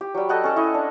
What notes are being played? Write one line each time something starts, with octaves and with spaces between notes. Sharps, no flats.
G4
F#3 G3
A4 D#5 F#5 G5
C#4 A4
E4 C#5 D#5
D4